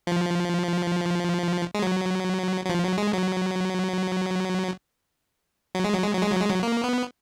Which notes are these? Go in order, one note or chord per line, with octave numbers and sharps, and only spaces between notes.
F3
G#3
F#3
F#3
F3
F#3
G#3
F#3
F#3
G#3
F#3
G#3
F#3
G#3
F#3
G#3
F#3
A#3
B3